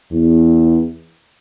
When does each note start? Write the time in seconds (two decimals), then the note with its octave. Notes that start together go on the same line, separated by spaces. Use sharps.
0.12 E2